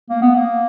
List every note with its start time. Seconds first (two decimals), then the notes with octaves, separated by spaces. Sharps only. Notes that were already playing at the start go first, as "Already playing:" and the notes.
0.09 A#3
0.21 B3
0.35 A#3